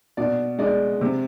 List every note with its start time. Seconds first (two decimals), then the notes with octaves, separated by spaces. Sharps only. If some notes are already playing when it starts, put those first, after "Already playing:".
0.17 B2 D5
0.59 G#3 D5
1.01 C3